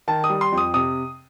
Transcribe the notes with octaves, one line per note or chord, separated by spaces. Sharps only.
D#3 A5
D#6
G3
C6
F2
D#6
C3 D#6